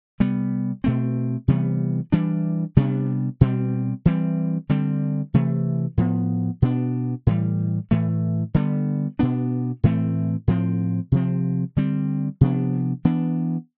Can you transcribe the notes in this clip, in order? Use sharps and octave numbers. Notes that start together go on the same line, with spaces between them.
C3 G3 B3
B2 A3 C4
C3 E3 G3 B3
E3 G3 D4
C3 G3 B3 D4
B2 G3 C4
E3 G3 C4
D3 G3 C4
C3 E3 A3
A2 F3 B3
B2 B3 D4
A2 E3 G3
A2 E3 A3
D3 G3 B3
B2 B3 D4
A2 E3 A3 C4
A2 F3 C4
C3 F3 C4
D3 G3 C4
C3 F3 B3 D4
E3 B3 D4